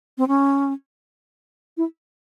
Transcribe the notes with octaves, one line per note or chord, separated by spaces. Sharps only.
C4
C#4
E4